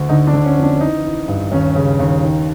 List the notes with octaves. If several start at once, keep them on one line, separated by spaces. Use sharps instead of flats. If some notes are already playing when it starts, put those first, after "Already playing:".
Already playing: D2
D3 D#4
D4
D3
C#4
F2
D4
E3 D#4
E3
G2
D#2 C#4
C#3
D#2
D#3